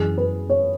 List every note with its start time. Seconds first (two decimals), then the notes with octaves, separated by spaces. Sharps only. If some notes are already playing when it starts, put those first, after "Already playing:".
Already playing: F#2 E3 G#4
0.18 B4
0.50 C#5